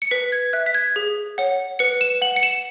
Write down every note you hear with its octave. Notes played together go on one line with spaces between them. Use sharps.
C#7
B4 B6
G#6
E5 F#6
B6
G#6
G#4
C#5 F#5
B4 C#7
E7
F#5 F#7
C#7
E7